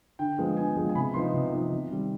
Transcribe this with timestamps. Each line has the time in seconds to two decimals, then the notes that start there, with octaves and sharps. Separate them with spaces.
0.19 D3 G5
0.38 F3 G#3 B3
0.57 D3 G#5
0.77 F3 G#3 B3
0.89 G#5
0.95 C3 B5
1.14 F3 B3 D#4 C6
1.34 C3
1.52 F3 B3 D#4
1.72 C3
1.90 D#3 G3 C4